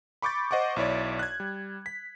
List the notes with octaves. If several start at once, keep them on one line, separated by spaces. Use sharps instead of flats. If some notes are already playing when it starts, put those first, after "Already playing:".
B5 C#6 D6 G6 A6
C5 D#5 F#5 C#6 D6
B1 E4 C#5 D5
F#6 G#6
G3
B6